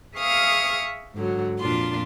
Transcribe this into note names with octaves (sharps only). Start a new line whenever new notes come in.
G#4 E5 F5 C#6 D#6 F6
G#2 D3 F#3
F2 A#2 D4 F4 C6